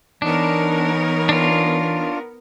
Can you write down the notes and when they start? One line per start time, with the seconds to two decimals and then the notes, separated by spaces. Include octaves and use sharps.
0.22 E3 B3 D4 D#4 A#4 C#5
1.29 D4 F4